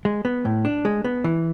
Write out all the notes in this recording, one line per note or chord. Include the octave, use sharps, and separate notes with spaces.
G#3
B3
A2
D4
G#3
B3
E3